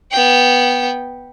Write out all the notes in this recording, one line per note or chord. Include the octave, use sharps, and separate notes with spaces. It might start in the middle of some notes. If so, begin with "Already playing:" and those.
B3 G5